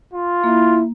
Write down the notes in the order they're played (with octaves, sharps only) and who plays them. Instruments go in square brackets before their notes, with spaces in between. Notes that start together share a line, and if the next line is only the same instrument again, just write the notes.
[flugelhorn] F4
[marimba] A#3 [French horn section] E4